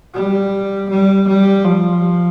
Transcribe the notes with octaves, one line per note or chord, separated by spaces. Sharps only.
G3
G3
G3
F3